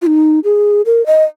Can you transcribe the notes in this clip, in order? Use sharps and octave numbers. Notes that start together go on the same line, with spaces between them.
F4
D#4
G#4
A#4
D#5